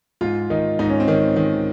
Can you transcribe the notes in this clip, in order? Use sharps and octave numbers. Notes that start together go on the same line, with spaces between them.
G#2 F4
D#3 D#4
G#2 D#4
C#4
C4
D#3 C#4
D#3